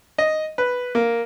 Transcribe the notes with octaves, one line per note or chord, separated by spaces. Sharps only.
D#5
B4
A#3